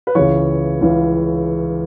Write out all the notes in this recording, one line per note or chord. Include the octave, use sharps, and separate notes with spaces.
B4
C#2 C#3 E3 C#5
C#2 C#3 E3